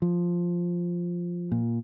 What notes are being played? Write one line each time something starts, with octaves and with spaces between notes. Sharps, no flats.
F3
A#2